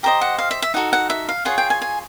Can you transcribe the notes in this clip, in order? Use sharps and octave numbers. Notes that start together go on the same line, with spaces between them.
G4 C5 D#5 A#5
F#5
F5
E5
E5
D#4 F#4 A4 F#5
F#5
E5
F5
F4 G#4 C#5 F#5
G5
G#5
G#5